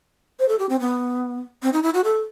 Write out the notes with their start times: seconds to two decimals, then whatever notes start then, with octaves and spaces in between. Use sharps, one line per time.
0.39 C5
0.49 A4
0.59 G4
0.69 C4
0.80 B3
1.63 C4
1.73 D#4
1.83 E4
1.94 F#4
2.04 A4